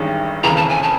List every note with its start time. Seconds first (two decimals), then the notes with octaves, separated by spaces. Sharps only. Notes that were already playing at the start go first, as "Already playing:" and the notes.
Already playing: A1 G2 D#3 G#3 C#4
0.43 F1 D#2 C#3 E3 A#5
0.56 A5
0.69 G#5
0.83 A5